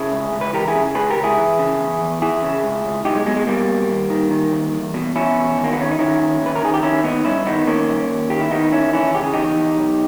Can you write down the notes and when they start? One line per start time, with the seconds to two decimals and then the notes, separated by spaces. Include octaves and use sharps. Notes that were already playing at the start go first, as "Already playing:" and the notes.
Already playing: C#3 E4 G#4
0.12 C#2
0.33 C#2
0.41 B4
0.53 E3 G4 A#4
0.68 E4 G#4
0.75 C#3
0.95 C#2 G#4 B4
1.10 G4 A#4
1.16 C#2
1.24 E4 G#4
1.38 E3
1.59 C#3
1.79 E2
2.01 E2
2.22 E3 E4 G#4
2.42 C#3
2.64 C#2
2.85 C#2
3.05 B1 D#4 G4
3.16 G#3
3.26 B2 G#3
3.36 G#3
3.47 B2 G3 A#3
3.68 B1
3.89 D#2
4.10 D#3
4.31 D#3
4.52 D#2
4.74 E2
4.94 B2
5.16 B2 C#4 E4
5.36 E2
5.58 D#2
5.64 A#3
5.73 B3
5.78 D#3 C#4
5.91 D#4
5.99 D#3 C#4 E4
6.20 D#2
6.42 D#2 B4
6.56 A#4
6.62 D#3 G#4
6.74 G4
6.83 D#3 C#4 E4
7.04 D#2 B3 D#4
7.25 G2 C#4 E4
7.46 D#3 B3 D#4
7.67 D#3 A#3 C#4
7.88 G2
8.09 D#2
8.30 D#3 G4
8.40 E4
8.51 D#3 B3 D#4
8.72 D#2 C#4 E4
8.93 E3 C#4 E4
9.14 C#3 G4
9.24 G#4
9.34 E2 D#4 G4
9.56 E2
9.77 B1